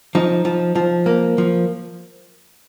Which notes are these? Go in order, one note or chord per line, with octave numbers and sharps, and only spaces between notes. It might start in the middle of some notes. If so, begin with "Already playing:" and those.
F3 D#4
F3
F3
A#3
F3